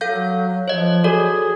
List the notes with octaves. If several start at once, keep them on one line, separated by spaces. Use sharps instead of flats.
F#3 A4 F5 G6
F3 C#5 D#5
F#4 G#4 A4 D5